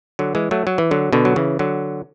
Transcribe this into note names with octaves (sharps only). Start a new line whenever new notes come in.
D3 F#3
E3 G#3
F#3 A3
F#3
E3
D3 F#3
B2 D3
F#3
C#3 E3
D3 F#3